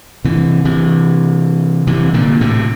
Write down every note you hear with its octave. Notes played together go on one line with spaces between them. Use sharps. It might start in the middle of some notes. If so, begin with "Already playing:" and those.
C3 E3
C3 E3
C3 E3
A#2 D3
A2 C3